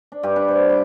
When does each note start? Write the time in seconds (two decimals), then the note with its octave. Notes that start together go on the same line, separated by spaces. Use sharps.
0.12 D4
0.23 G2 G4 B4
0.36 D4
0.48 C5 D5
0.69 B5 D6